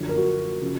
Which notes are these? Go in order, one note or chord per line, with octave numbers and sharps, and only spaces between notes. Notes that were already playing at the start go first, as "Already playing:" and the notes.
Already playing: F#2 D3 F3
A#4
F#4
C#3 F3